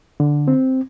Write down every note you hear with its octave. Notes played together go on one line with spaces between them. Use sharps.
D3
C4